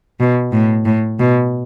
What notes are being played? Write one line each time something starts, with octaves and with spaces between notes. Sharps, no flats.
B2
A2
A2
B2